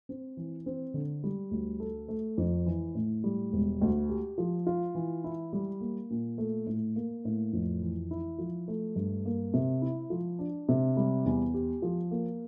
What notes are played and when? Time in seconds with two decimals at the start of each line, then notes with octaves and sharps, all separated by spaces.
0.09 C4
0.37 E3
0.66 C4
0.94 D3
1.24 G3
1.51 D2
1.80 A4
2.08 A3
2.38 F2
2.66 E3
2.95 A2
3.24 G3
3.52 E1
3.81 D2
4.09 G4
4.38 F3
4.67 F4
4.95 E3
5.24 E4
5.53 G3
5.81 A#3
6.10 A#2
6.38 A3
6.67 A2
6.96 A#3
7.25 A2
7.53 F2
7.82 E3
8.11 E4
8.38 F3
8.68 A3
8.96 G2
9.25 A#3
9.54 C3
9.82 E4
10.10 F3
10.39 D4
10.69 C3
10.97 G3
11.26 E2
11.54 G4
11.82 F3
12.11 A#3